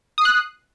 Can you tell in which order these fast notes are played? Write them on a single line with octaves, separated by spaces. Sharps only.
D#6 C7 F#6